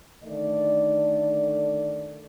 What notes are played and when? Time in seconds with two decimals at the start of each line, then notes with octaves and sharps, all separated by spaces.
0.24 D3 D#3 A3 D5